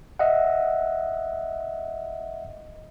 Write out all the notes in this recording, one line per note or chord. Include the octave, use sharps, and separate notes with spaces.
D#5 E5 F#5